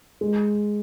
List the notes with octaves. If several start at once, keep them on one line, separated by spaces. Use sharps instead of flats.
G#3